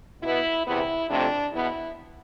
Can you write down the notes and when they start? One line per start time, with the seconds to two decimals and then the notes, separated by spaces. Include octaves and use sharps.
0.23 B2 B3 E4
0.66 E2 C3 E3 B3 E4
1.10 F2 C3 F3 A3 C4 D4
1.53 E2 B2 B3 E4